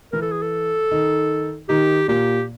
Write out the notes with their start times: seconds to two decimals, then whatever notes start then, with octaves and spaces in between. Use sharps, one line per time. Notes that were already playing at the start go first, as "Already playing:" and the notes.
0.12 E3 E4 A#4
0.22 A4
0.32 G#4
0.42 A4
0.91 D#3 D#4
1.69 D#3 D#4 G4
2.08 A#2 A#3 G4